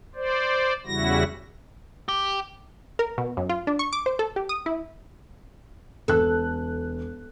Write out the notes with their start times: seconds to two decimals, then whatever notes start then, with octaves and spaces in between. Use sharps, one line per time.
0.15 C5 D5
0.86 E2 C#3 G3 E4 F#4 A#6
2.09 G4
2.99 A#4
3.18 B2
3.37 F#2
3.49 F4
3.67 D4
3.79 C#6
3.93 D6
4.06 C5
4.19 A4
4.36 G4
4.49 D#6
4.66 E4
6.08 E1 A4 F#6